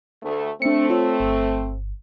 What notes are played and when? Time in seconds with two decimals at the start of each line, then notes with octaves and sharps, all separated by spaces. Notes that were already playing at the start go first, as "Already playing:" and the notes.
0.22 D2 A3
0.62 A3 C4 D4 C#7
0.90 F4 C#5
1.20 G1